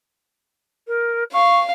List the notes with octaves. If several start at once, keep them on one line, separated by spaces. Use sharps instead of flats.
A#4
F5 C#6